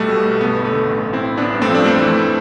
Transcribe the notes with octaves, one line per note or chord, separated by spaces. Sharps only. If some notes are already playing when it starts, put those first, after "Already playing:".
Already playing: B1 G3 A3
B2
B1
G1 B3
G1
A3
D3
A1
A1
C4 E4
A1
A1 B3 D4
G2
A3 C4
F3 D4
F2 A3 C4
E3